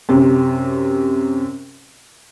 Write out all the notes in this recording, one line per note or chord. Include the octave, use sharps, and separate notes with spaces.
F#2 C3